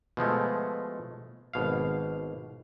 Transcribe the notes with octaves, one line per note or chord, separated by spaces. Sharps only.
B2 F3 G#3 A3
G#1 B2 F5